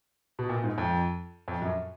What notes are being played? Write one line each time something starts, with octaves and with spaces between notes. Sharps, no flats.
B2
A#2
G#2
F2
F2
F#2